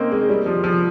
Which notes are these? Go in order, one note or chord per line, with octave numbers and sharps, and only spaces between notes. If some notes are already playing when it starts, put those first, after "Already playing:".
Already playing: A#3 C4 C#4 D#4
G#3
G3
F3
F3